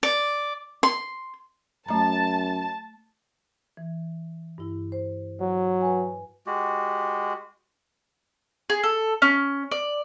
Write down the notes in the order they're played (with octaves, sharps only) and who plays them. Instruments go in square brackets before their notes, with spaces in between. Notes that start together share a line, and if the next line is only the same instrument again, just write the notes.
[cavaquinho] D5
C6
[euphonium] F#2 [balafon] A3 A#5 [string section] A5
[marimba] E3
G2 E4
C5
[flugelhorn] F#3
[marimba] B4 G#5
[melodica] G#3 F#4 G4
[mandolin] G#4
A4
C#4
D5